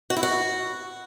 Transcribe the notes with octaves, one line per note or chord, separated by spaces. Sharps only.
F#4
E4
F#4